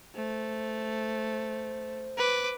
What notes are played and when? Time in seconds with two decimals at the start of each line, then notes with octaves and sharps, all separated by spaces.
0.15 A3 C5
2.18 B4 D6